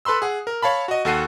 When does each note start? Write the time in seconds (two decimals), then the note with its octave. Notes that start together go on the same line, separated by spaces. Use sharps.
0.05 A4 B4 B5 C6 E6
0.22 G#4 F#5
0.47 A#4
0.62 C#5 F5 A5 B5
0.88 F#4 D#5
1.05 D#2 F#4 A4 F#5 C7 D#7